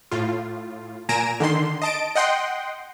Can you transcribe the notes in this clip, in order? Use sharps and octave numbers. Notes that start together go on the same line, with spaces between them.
A2 F4
A#2 G#5 A#5 A#6 D7 E7
D3 D#3 C6
D#5 A5 D7
D#5 F#5 G5 C6